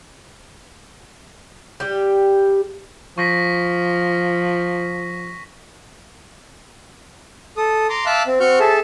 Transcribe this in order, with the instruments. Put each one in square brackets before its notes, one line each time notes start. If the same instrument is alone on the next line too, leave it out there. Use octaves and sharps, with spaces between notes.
[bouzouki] G3 G4
[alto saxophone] F3 [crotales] C#6 A#6 B6
[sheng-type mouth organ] A4 D#6
A#5 C6 D6
E5 F5 A5 D6 E6 F#6
C4
C4 F#4 C#6 F6 G6
G#4 A4 E5 A5